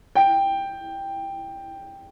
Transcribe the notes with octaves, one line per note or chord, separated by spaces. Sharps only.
G5